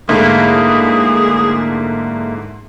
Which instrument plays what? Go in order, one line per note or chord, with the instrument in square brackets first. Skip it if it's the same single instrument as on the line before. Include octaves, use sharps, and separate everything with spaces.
[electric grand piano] G#2 D3 A3 [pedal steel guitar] A#3 E4 [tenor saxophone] G#4